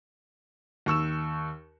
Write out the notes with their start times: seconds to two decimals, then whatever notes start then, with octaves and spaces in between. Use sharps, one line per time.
0.86 D#2 C#6 E6 E7